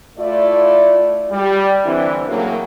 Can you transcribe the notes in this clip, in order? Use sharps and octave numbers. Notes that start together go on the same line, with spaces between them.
A3 E4 F4 D5
G3
D3 E3 C4 E4
A2 C#3 F#3 A#3